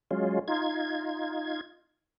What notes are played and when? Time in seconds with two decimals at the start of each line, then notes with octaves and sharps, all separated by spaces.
0.11 F#3 G#3 C#4 F4
0.48 D#4 F4 G#6